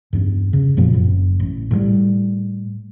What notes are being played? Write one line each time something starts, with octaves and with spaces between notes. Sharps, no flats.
E2 G2
C#3
F2 A#2 F3 C4
F#1
A1
A2 F3 G3